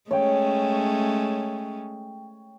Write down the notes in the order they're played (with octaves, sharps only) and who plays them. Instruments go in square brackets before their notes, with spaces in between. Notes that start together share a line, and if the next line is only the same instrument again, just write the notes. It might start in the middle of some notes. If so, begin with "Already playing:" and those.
[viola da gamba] G#3 A3 C#4 [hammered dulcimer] C#5 G5